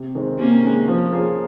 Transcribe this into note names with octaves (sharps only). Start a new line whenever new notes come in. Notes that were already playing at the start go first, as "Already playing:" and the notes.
Already playing: C3
D#3 G#3 C4
C3 A#3 C#4
D#3 G#3
F3
A#3 F4 G#4 C#5